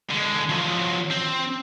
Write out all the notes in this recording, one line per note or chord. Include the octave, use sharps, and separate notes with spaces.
D3 G#3
F3 F#3
C4